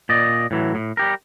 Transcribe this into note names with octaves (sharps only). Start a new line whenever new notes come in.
A#2 D5 D#5
A2 E3 F#3
A2
G3 G4 A#4